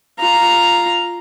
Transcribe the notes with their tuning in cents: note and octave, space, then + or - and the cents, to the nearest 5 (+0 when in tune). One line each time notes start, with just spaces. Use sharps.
F4 +0 A#5 +0